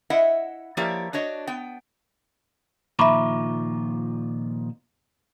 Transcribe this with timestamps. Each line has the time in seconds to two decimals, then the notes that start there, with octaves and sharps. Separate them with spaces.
0.10 E4 D#5 E5 F#5
0.77 F3 A#3 E4 G4 C#5 D5
1.13 D4 F#4 C#5 D#5
1.47 B3 G5
2.99 A#2 D#3 F3 E5 A#5 B5 C#6 D6